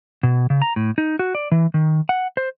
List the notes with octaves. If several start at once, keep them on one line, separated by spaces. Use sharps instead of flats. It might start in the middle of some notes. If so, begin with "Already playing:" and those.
B2
C#3
A#5
A2
D#4
F#4
D5
E3
D#3
F#5
C5